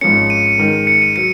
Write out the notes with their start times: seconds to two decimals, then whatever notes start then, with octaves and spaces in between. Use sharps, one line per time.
0.01 G#1 G#2 F3 G#3 C#4 C#7
0.30 D#7
0.58 G#2 D#3 G#3
0.87 C#7
1.02 D#7
1.16 F#3 C#7